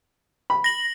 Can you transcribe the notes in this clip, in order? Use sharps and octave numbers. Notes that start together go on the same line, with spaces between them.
B5
A#6 F#7